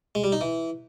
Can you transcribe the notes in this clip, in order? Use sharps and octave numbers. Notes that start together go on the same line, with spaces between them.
G#3
G3
D#4
E3